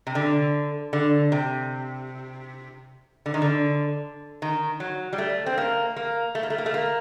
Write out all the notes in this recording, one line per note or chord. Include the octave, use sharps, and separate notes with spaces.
C3
D3
D3
C3
D3
D#3
D3
D#3
F#3
G3
A3
C4
A#3
A#3
A3
A#3
A3
A#3
A3
A#3